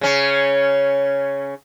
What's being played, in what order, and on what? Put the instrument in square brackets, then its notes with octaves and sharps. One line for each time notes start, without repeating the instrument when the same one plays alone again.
[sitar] C#3 C#4